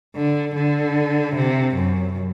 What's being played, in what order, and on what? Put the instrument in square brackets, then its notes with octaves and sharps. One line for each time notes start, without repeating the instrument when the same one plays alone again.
[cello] D3
D3
C3
F#2